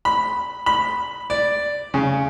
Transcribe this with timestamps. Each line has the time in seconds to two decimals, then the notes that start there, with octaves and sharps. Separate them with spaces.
0.05 B5
0.66 B5
1.30 D5
1.94 C#3